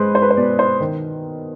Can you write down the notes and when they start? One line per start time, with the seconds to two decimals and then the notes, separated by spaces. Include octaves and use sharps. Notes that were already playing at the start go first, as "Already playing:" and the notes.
Already playing: G#3 B4 C5
0.15 C5
0.22 B4
0.30 C5
0.37 B2 D5
0.59 C5
0.80 D#3